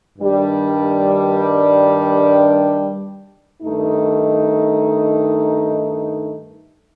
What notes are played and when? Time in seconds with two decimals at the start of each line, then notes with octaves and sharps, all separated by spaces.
0.19 G2 D#3 G3 D4
3.62 G2 D#3 A3 D#4